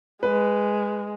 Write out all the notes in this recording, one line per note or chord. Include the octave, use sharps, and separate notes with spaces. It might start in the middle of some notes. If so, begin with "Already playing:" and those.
G#3 B4